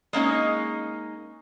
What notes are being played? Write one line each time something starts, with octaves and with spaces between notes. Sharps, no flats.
G#3 A#3 C#4 D#4